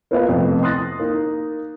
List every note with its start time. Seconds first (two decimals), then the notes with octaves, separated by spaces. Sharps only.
0.11 A#3 B3 F4 B4 D#5 F5
0.29 F2 C3 A3 B3
0.63 C6 D#6 F#6 A6 A#6
1.00 A#3 D#4